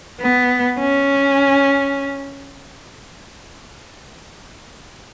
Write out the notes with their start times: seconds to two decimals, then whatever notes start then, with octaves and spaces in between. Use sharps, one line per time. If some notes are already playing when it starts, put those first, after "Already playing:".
0.21 B3
0.79 C#4